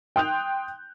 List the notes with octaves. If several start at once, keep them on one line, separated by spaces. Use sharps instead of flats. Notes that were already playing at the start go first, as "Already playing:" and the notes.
G5 C6 D#6 F#6 G6 F7